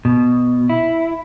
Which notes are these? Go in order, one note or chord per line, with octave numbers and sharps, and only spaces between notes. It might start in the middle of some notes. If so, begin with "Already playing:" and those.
B2
E4